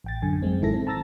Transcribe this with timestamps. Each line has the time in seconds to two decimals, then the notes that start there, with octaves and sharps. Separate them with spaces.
0.04 A1 G5 A6
0.22 F#2 D3 G#5
0.42 F#2 G#3 C4
0.61 A1 D#3 E4 A4 A#6
0.74 C4
0.87 A5 A#5 E6 A6 A#6